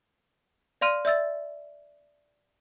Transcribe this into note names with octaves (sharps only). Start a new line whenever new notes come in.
D5 F5 C6 F6 D#7
D5 E5 E6 A6